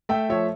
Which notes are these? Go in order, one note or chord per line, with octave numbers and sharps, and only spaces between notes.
A3 E5 G5
F3 C#5 E5